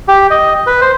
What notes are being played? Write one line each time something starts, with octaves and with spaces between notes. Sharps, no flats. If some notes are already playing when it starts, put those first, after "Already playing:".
G4
D#5
B4
C5